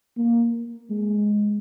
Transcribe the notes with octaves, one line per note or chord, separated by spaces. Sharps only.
A#3
G#3